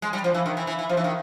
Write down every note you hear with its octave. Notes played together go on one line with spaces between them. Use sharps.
G#3
G3
F3
E3
D#3
E3
E3
E3
F3
E3
D#3